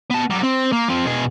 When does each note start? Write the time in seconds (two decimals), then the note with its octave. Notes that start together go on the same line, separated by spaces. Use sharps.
0.10 B3 A5
0.30 F#3 G3
0.43 C4
0.73 A#3
0.89 F3 C4
1.06 B2 G#4